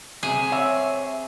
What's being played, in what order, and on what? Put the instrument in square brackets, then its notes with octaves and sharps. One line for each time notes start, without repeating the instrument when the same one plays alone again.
[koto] C3 G#4
[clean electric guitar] C#5 E5